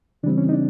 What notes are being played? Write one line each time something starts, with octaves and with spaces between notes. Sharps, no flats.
C#3 E3 G3 C4 D4
C#4
D#4
D4